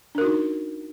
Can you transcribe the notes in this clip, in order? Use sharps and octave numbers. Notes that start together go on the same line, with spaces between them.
D4 D#4 F#4 A#4